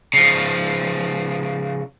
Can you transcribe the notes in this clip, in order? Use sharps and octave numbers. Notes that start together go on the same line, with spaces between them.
C#3 F3